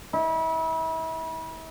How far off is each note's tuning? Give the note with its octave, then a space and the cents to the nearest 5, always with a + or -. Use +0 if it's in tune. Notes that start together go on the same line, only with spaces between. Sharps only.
E4 -35